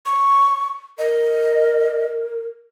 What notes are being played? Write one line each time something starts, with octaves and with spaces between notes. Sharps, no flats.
C#6
A#4 D#5